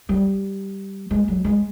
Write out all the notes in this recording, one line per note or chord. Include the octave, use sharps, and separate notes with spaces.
G3
G#3
F#3
G#3